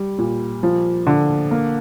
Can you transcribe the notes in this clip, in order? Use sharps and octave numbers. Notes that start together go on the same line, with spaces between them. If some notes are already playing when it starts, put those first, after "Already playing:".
Already playing: G3
A#2
F3
D3
A#3